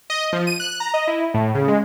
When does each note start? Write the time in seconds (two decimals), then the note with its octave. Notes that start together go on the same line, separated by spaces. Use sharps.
0.10 D#5
0.33 F3
0.47 D#7
0.60 F#6
0.80 A#5
0.94 D#5
1.07 E4
1.34 A2
1.55 C#3
1.68 G#3